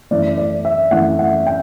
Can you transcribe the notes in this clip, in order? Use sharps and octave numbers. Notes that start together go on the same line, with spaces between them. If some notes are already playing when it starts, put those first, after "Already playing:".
F#2 E3 A3 D5
D5
E5
F#2 E3 A3 F#5
F#5
G5